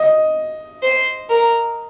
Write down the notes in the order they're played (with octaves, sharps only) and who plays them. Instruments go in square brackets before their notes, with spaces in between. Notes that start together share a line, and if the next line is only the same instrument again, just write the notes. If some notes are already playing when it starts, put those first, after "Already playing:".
Already playing: [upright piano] D#5
[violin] C5
A#4